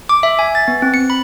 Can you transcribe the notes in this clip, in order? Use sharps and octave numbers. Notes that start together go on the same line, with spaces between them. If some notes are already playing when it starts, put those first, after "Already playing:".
D6
E5
G#5
A6
B3
C4
C#7
B5